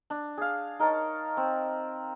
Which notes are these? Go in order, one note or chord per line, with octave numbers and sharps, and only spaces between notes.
D4
G#4 F5
D#4 A#4 C#5 A5
C4